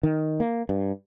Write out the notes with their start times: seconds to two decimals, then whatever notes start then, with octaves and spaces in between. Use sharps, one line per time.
0.03 D#3
0.40 A#3
0.69 G2